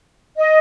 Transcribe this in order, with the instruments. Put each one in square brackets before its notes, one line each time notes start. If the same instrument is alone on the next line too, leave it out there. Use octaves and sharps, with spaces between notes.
[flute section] D#5